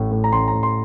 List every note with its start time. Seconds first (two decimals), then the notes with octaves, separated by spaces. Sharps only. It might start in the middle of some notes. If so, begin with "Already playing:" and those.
Already playing: A1 A2
0.12 A2
0.24 A#5
0.32 A1 C6
0.48 A#5
0.53 A1
0.63 C6